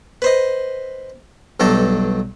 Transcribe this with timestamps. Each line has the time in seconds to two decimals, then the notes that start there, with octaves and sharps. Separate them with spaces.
0.22 B4 C5 D#5
1.60 B1 G2 F#3 D#4 A4